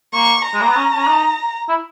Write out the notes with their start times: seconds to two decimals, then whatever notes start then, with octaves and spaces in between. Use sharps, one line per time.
0.14 A#3 C#6
0.45 A#5
0.54 G#3
0.61 A#3
0.68 B3
0.76 C#4
0.96 C#4
1.07 D#4
1.69 E4